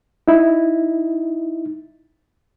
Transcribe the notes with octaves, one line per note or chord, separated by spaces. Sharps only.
D#4 E4